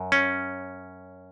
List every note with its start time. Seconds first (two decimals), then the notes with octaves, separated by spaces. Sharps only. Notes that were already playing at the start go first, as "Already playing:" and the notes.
Already playing: F#2
0.12 C#4